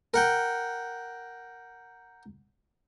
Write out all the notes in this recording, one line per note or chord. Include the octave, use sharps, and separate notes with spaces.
A#4 F#5 G5